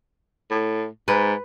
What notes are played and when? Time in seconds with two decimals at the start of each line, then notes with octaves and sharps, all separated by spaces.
0.50 A2
1.08 G#2 B4